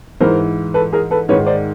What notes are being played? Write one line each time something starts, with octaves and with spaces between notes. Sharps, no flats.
G#2 E3 A#4 C5
A4 B4
G#4 A#4
A4 B4
G#2 D#3 B4 C#5
C5 D5